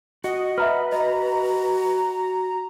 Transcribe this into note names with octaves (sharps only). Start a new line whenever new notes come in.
F#4 D#5 F#5
B4 E5 A#5 F6
F#4 D#5 A#5